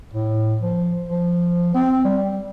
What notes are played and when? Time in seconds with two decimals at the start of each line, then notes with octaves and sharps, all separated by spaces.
0.13 A2
0.61 F3
1.09 F3
1.75 C4
2.05 G3